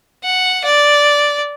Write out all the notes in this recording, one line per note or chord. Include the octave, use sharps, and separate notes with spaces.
F#5
D5